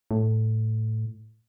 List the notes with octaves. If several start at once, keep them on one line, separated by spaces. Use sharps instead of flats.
A2